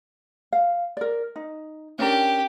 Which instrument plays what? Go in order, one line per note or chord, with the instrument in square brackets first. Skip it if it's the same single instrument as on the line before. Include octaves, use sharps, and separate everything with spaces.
[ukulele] F5
A#4 D5
D#4
[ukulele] C#4 D4 A#4 [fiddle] G4